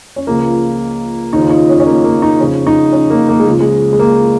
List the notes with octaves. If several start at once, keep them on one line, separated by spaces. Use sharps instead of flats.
C#4
C#2 C#3 F3 A#3
D#2 C#3 F3 D#4
F4
D#4
C#4
C#4
A#3
A#3
D#4
F2 C#3 F3 C#4
D#4
C#4
A#3
A#3
G#3
C#2 C#3 F3
G#3
G#3
A#3